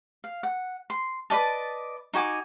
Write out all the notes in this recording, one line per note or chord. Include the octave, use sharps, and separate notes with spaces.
F5
F#5
C6
B4 D5 D#5 A5
D#4 F#4 G#5 D6